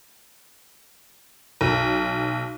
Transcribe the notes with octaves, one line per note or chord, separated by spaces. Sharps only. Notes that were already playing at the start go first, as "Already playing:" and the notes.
B1